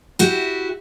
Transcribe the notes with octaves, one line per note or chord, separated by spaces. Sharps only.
E4 F#4 G4